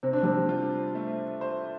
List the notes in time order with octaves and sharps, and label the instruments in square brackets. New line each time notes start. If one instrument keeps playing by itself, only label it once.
[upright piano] C3 [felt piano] C4
[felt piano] D4
G3 C4
[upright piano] F4
A3
C5